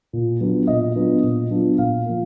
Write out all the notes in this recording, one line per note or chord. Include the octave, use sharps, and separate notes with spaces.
A#2
F#3 B3 D4 F4
A#2 D#5
F#3 B3 D4 F4
A#2
F#3 B3 D4 F4
A#2 F5
F3 A#3